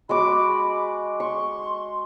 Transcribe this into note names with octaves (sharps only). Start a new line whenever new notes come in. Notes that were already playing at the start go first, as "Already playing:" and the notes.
G#3 F#4 B5 D6
C6 C#6